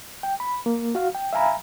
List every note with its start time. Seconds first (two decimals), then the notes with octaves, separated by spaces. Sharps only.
0.23 G5
0.40 B5
0.66 A#3
0.95 F#4 F5
1.15 G5
1.33 E5 F5 G#5 A#5 B5